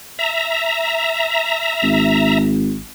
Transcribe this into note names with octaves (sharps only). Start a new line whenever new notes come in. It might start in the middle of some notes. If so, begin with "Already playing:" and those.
E5 A#5
G#1